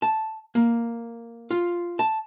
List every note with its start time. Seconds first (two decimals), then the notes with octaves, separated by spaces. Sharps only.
0.02 A5
0.55 A#3
1.51 F4
1.99 A5